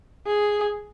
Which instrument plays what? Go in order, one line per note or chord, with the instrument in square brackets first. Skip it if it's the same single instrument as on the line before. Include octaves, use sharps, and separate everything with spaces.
[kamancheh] G#4